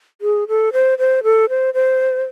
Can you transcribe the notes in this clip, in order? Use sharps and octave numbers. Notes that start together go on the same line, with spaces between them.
G#4
A4
C5
C5
A4
C5
C5